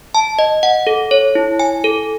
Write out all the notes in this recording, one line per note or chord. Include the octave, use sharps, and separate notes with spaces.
A5
D#5
F#5
A4
C#5
E4
G#5
A4